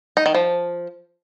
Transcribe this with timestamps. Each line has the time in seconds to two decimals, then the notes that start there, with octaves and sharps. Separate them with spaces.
0.17 D#4
0.26 D#3
0.35 F3